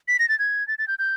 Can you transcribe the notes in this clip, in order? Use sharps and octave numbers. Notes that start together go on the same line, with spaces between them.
B6
A#6
A6
G#6
A6
A6
G6
G6